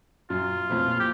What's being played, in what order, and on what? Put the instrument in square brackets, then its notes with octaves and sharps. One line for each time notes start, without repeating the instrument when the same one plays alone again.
[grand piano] F#2 [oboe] F4
[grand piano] B1 F2 A2
A#2
[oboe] G4